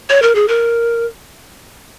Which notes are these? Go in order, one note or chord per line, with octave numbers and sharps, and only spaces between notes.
C#5
A#4
G#4
A#4